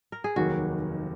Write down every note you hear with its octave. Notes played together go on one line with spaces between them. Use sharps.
A#4
G#4
F1 D#2 D#3 F#3 A#3 F#4